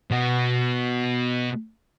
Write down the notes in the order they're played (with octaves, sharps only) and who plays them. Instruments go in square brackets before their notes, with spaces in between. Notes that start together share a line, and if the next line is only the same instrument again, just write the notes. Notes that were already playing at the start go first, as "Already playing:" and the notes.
[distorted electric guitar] B2 F#4